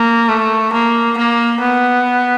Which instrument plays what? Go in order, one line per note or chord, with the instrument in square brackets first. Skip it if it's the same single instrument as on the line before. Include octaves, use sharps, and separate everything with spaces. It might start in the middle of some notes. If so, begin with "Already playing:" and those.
Already playing: [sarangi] A#3
A3
A#3
A#3
B3